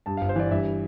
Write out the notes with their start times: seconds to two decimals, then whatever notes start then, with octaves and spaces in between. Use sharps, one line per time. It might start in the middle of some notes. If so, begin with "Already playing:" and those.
0.06 G2 A5
0.17 F5
0.21 G1
0.29 C5
0.36 E3 D5
0.51 G2 E5